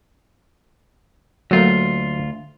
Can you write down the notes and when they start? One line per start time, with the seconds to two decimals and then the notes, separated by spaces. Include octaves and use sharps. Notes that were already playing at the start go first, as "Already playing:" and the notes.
1.51 D2 F#3 A3 A#3 F4